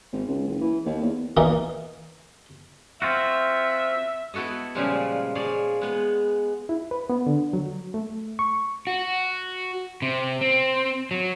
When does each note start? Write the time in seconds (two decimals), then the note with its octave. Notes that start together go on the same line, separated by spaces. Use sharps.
0.13 G#1
0.27 C#2
0.47 F#1
0.61 E3
0.86 D#2
1.02 E2
1.37 A#2 E3 A#3 D#4
3.02 C4 F4 F#4 E5
4.34 B3 E4 F#4 A4 D#5
4.75 A#2 C#3 F3 G3 G#3
5.35 F3 G#4 C#5 D5
5.81 G#3 B3
6.69 E4
6.91 B4
7.10 B3
7.27 D3
7.53 F#3
7.94 A3
8.39 C#6
8.87 F#4
10.02 C3
10.41 C4
11.11 F#3